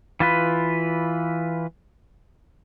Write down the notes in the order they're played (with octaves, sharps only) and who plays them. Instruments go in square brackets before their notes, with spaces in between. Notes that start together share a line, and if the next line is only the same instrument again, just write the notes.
[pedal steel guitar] E3 F4 B4